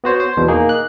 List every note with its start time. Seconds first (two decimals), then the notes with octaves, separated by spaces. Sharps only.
0.04 B3 F#4 C5 C#5
0.20 C5
0.37 E2 B2
0.48 A#3 D#4 G#4
0.69 F#6